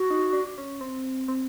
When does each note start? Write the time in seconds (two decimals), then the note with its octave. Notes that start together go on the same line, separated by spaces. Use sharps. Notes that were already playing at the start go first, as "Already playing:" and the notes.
Already playing: F#4
0.11 D#4
0.33 D4
0.58 C#4
0.81 C4
1.28 C4